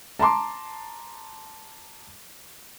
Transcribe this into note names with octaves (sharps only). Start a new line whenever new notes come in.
A5 A#5 C6 D6